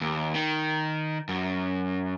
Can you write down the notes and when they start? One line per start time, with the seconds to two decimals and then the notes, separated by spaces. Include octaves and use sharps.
0.01 D#2
0.35 D#3
1.29 F#2